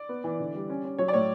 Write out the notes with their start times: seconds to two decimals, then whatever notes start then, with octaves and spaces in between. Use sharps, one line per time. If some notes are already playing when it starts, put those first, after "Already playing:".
Already playing: D5
0.09 B3
0.24 E3
0.40 D3
0.54 G3
0.70 C#4
0.85 C#4
0.98 F#3 C#5
1.08 D5
1.13 A2 C#5